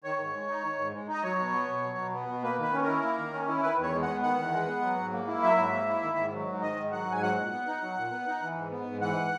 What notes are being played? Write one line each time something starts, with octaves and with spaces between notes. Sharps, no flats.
D#3 C#5
G#2
G#3
D#4
D#3
G#2
G#3
D#4
D#5
F#3 C#5
B2
B3
B2
F#3
B2
B3
B2
A#3 B4
D#3 B4
C#4
A#4
E4
A#3
D#3
C#4
E4
D#3 B4
E2 C#5
G#3
F#5
B3
D#3 F#5
E2
G#3
B3
F#3
G#2
A#3
E4
F#3 E5
G#2
A#3
E4
D#3
G#2
F#3
G#2
D#3 D#5
G#2
F#3 F#5
G#2 G#5
F#3 F#5
A#2
B3
D#4
F#3
A#2
B3
D#4
E3
G#2
B3
G#2
E3 F#5